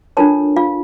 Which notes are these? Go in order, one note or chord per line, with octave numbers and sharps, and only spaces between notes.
D4 F4 A4 A#4 C#5 A5
F4 F5